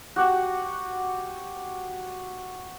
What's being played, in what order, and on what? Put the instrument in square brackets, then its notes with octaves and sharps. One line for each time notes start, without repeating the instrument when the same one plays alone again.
[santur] F#4 G4 F#5